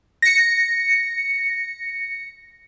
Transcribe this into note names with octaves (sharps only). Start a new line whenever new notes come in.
A#6 C#7